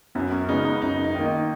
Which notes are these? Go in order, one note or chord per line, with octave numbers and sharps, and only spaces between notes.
F#2 B3
C#4
C#3 G#3 B3 D#4
D#4
F#2 D#4
D#4
D#3 A#3
D#4